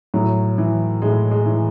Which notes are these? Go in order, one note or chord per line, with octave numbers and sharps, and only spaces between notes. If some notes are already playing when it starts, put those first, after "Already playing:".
A2 F#3
E3
A2 G#3
G#3
E3